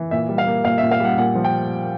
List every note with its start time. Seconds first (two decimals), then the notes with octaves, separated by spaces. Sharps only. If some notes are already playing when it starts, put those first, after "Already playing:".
Already playing: E3
0.11 A#2 E5
0.29 G3
0.38 F5
0.46 A#3
0.65 A#2 F5
0.78 E5
0.82 A#2
0.91 F5
1.00 G3 F#5
1.18 A#2 F#5
1.35 F3
1.45 G5